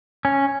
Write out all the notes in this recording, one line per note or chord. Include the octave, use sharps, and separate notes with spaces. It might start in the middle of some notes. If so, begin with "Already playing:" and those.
C#4